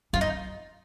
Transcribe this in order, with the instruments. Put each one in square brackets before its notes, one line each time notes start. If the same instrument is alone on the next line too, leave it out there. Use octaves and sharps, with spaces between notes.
[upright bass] F#2 [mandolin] F4
[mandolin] D#4